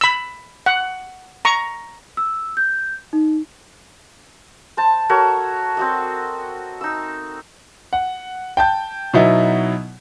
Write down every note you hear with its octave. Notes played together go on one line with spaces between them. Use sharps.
B5 E6
F#5
A#5 C#6
E6
G6
D#4
C5 A5
F#4 A4 A#4 C#5
C4 F#4 D#5
D#4 E6
F#5
G5 A5 G6
B2 F#3 B3 D#4 E4